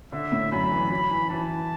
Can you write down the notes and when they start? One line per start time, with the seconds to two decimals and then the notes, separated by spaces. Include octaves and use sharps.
0.12 D3 E5
0.32 A2
0.52 F#2 B5
0.71 E3
0.90 F#3 B5
1.11 E3
1.30 E3 A5